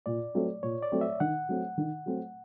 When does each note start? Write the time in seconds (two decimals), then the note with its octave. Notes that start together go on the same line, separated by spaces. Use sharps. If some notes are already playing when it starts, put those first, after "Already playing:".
0.06 A#2 D5
0.35 F#3 A3 C4
0.63 A#2 C#5
0.83 D5
0.92 F#3 A3 C4
1.01 E5
1.20 D#3 F#5
1.49 F#3 A3 C4
1.78 D#3
2.06 F#3 A3 C4